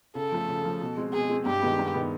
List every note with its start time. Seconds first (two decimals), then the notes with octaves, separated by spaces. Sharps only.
0.15 C#3 A4
0.32 F3 A3
0.49 C#3
0.64 F3 A3
0.81 B2
0.97 G#3 C4
1.13 B2 G#4
1.30 G#3 C4
1.46 G2 G4
1.62 D#3 G#3 B3
1.79 G2
1.94 D#3 G#3 B3